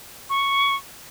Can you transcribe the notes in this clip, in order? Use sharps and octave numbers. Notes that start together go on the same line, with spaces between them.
C#6